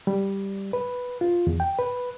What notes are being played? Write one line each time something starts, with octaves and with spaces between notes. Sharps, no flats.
G3
B4
F4
E2
G5
B4